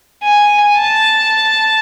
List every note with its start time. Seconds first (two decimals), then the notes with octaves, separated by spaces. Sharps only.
0.23 G#5
0.77 A5